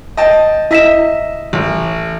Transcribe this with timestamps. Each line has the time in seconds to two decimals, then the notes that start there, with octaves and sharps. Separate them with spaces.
0.17 D#5 G5 A5
0.71 E4 D#5 E5 B6 E7
1.53 A1